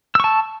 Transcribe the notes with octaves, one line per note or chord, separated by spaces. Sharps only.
A5 C#6 E6